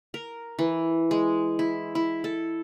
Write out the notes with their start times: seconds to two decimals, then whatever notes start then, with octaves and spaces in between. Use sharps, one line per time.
0.14 A#4
0.59 E3
1.11 G#3
1.59 E4
1.95 E4
2.24 A4